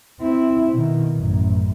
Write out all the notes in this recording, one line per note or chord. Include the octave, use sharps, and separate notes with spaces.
C4 E4
B2 D#3
A1 F#2